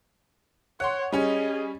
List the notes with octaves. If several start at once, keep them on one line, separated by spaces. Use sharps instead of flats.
C#5 F#5 C6
G3 C#4 G#4 D#5